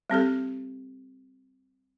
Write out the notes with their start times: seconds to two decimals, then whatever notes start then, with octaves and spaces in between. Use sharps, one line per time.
0.10 G3 C4 G4 A4